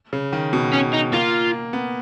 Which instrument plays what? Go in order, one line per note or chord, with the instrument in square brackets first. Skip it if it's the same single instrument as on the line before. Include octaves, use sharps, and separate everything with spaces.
[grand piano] C#3
D#3
B2
[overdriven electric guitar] C#4
D#4
[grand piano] A#3 [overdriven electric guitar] F4
[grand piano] B3